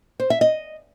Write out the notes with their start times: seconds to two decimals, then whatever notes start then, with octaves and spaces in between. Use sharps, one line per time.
0.20 C5
0.30 E5
0.41 D#5